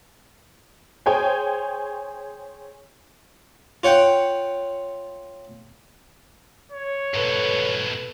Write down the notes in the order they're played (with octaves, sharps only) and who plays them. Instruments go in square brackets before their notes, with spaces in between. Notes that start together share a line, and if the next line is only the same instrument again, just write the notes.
[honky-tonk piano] G#4 C5 C#5 G5 G#5
[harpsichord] F4 C#5 F#5 G5
[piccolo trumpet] C#5
[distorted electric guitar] G#2 B2 [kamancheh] A4 B4